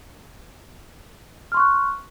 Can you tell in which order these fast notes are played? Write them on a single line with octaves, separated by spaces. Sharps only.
F6 C6 C#6 F#6